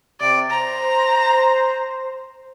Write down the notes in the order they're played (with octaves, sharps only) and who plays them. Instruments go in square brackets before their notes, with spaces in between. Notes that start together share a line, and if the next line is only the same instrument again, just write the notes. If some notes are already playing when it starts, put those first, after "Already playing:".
[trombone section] C3 [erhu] D5
[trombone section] C5 [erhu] A#5